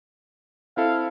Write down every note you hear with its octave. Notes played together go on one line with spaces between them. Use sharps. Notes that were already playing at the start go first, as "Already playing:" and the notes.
C4 E4 A4 F5